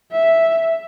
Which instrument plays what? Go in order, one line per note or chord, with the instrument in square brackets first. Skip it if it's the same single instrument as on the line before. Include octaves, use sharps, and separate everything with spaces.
[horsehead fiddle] E5